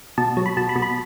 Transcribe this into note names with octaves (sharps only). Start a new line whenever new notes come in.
B2 A5
F#3
B5
B2 A5
B5
B2
B5